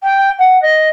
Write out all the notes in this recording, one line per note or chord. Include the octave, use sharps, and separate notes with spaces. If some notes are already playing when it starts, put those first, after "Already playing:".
G5
F#5
D#5